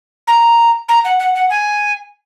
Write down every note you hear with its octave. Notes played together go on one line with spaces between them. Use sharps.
A#5
A#5
F#5
F#5
F#5
G#5